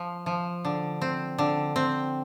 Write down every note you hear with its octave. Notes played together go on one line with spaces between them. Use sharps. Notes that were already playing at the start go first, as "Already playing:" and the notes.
Already playing: F3
F3
D3
C4
D3
C4